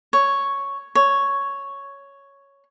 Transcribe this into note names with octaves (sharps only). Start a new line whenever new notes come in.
C#5
C#5